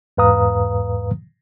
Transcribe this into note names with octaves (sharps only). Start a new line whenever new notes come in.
E2 G#2 B4 F5 A#5 D#6